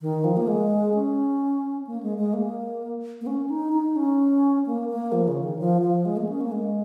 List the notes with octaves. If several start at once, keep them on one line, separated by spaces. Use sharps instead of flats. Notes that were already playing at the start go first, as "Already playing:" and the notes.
D#3
F3
A#3
G#3
C#4
A#3
G#3
G#3
A#3
A#3
C#4
D#4
D#4
C#4
A#3
A#3
F3
C#3
D#3
F3
F3
G#3
A#3
C#4
A#3
G#3